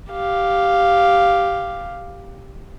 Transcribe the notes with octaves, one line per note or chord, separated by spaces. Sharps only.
G4 F5